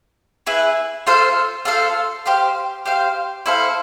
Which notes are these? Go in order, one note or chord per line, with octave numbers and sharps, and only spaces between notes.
E4 G#4 B4
F4 A4 C5 F5
F4 A4 C5 F5
G4 C5 F5
G4 C5 F5
E4 A4 C5 F5